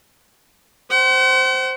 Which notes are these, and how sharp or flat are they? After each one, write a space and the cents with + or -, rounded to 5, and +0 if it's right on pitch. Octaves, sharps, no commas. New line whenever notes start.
C5 +0 F#5 +45